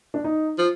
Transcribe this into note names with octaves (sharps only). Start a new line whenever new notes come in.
D4
D#4
F3